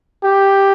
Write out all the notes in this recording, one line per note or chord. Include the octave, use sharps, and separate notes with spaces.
G4